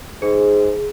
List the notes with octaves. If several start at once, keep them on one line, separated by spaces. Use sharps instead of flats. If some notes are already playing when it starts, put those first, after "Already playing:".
G#2 G#4